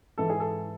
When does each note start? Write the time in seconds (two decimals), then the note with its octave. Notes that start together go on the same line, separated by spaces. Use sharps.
0.18 G#2 E3 A4
0.30 G#4
0.40 A4